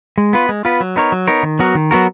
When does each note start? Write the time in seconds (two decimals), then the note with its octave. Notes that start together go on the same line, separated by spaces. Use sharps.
0.18 G#3
0.33 B3 F4 B4
0.49 G#3
0.65 B3 F4 B4
0.80 F#3
0.96 B3 D#4 A#4 C#5
1.12 F#3
1.27 B3 D#4 A#4 C#5
1.43 D#3
1.59 F#3 B3 F#4 A#4
1.75 D#3
1.91 F#3 B3 F#4 A#4